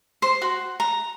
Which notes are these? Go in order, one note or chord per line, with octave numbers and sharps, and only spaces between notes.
C5
F#4
A#5